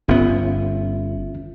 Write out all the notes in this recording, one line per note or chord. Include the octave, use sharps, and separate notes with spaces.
G1 B3 C#4 F4 E5